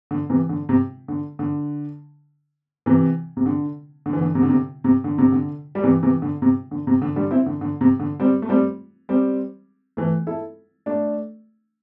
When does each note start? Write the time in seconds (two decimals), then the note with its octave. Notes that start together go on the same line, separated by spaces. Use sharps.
0.11 D3
0.30 C3 E3
0.49 D3
0.69 C3
1.08 D3
1.39 D3
2.86 C3 E3
3.37 C3
3.46 D3
4.06 D3
4.13 E3
4.21 D3
4.35 C3
4.42 D3
4.50 C3
4.84 C3
5.04 D3
5.18 C3
5.32 D3
5.75 G3
5.83 C3 E3
6.03 C3 E3
6.22 D3
6.42 C3
6.71 D3
6.87 C3
7.02 D3
7.16 D3 G3
7.31 C4 E4
7.46 D3
7.61 D3
7.81 C3
8.00 D3
8.20 G3 C4
8.42 A3
8.49 G3 C4
9.09 G3 C4
9.97 E3 A3
10.27 E4 A4
10.86 A3 D4